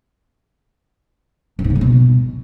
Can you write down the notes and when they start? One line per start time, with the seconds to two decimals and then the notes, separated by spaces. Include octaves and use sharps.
1.59 F#2
1.64 G#2
1.70 C#3
1.76 F#3
1.81 B2